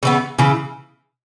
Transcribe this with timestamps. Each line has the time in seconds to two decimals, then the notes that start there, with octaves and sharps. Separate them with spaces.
0.03 C#3 E3 B3
0.39 C#3 E3